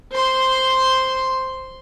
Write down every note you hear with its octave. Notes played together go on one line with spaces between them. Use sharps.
C5 C6